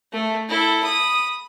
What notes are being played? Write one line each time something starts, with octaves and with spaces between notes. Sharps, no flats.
A3
E4 A4
B5 D#6